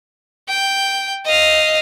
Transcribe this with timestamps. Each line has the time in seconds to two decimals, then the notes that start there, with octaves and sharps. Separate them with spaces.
0.48 G5
1.26 D#5 F5